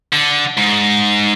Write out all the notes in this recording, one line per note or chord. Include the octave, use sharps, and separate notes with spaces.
D3
G#2